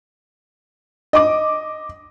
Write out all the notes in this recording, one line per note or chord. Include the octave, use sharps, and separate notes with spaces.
D#5 D6